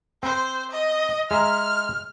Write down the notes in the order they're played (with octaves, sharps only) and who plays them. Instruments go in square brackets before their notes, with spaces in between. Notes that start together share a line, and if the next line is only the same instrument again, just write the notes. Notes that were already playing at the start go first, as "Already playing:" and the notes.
[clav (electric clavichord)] C4 [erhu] C5
[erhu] D#5
[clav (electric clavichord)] G#3 E5 A#5 [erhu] F6